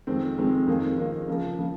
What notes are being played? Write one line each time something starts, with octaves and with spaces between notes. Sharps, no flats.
F2 D#3 G#3 C4
F2 D#3 G#3 C4
F2 D#3 A#3 D#4 G#4
F2 D#3 A#3 D#4 G#4
C#3 F3 A#3
C#3 F3 A#3